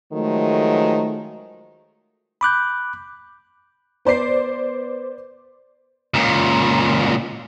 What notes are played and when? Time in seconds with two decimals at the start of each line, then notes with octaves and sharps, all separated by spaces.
0.13 D#3 F3 F#3 G#3 A3
2.41 B5 D6 F#6 G6
4.05 B3 C5 D5 C7
6.14 C#2 A#2